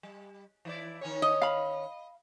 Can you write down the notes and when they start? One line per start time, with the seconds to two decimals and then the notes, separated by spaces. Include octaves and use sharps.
0.03 G3
0.65 E3 E4 D5
1.01 D#3 C#4 C#5
1.22 D#5
1.42 F5 B5